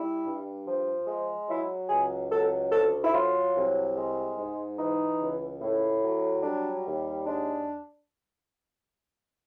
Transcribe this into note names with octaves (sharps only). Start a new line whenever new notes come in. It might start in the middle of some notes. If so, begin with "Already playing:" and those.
Already playing: G3 E4
G2
F3
G#3
F#3 E4
C#2 G#4
F#3 A4
D2 A4
E4
F#3 F4
C2
G#3
G#2
E3 D#4
C#2
A2
F#3
G3 D4
D#2
G#3 D4